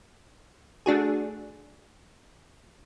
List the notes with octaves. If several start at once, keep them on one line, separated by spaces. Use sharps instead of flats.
A3 D4 F#4 G#4